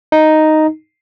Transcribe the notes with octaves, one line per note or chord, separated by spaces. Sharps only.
D#4